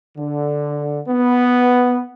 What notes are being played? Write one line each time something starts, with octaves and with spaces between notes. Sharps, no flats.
D3
B3